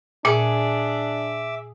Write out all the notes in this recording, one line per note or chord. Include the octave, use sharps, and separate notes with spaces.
A#2 D4 G#4 E5 D6